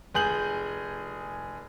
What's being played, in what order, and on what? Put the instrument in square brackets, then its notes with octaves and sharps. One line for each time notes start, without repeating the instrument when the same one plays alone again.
[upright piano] F1 G#4 G#5 G6 F#7